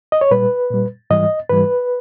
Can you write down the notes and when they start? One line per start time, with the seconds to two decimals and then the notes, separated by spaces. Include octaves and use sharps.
0.12 D#5
0.21 C#5
0.31 A#2 G3 B4
0.71 A#2 G3
1.10 G#2 E3 G3 D#5
1.49 G#2 E3 G3 B4